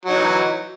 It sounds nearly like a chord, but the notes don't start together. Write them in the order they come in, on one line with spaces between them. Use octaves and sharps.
F#3 D#4 E3